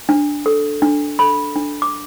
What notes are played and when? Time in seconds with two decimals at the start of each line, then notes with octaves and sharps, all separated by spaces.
0.09 D4
0.46 A4
0.82 D4
1.19 A4 B5
1.56 D4
1.82 D6